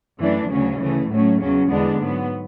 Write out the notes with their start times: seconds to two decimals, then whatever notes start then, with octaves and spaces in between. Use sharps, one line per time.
0.20 F#2 E3 A3 D4
0.49 D2 C#3 F#3 C#4
0.80 D2 C#3 E3 A3
1.09 A2 F#3 A3 C#4
1.39 E2 C#3 F#3 C#4
1.69 E2 D3 G#3 B3 D4
1.99 G#2 F#3 B3